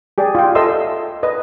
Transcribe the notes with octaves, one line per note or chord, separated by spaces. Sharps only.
G4 G#4 D5
F4 G5
A4 C5 D#5 E5 C6 E6
B4 D#5